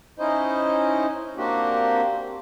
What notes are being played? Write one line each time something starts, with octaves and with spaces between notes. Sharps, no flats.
C#4 D#4 E4 C5 D#5
A#3 C4 D4 F#4 G4